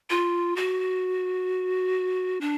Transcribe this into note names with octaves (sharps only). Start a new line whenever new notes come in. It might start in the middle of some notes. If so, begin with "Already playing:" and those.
F4
F#4
D4